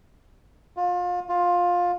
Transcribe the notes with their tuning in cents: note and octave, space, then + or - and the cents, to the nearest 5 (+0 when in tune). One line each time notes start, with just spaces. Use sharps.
F4 +30
F4 +15